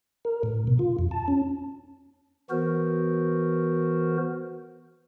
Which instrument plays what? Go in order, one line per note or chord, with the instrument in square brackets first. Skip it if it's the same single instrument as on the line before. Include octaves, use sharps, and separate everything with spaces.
[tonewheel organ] A#4
A2
B2
F4
F2
A5
C#4
[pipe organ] E3 B3 F#4 A#4 C5